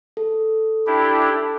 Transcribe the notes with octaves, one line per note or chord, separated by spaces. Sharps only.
A4
D4 E4 G4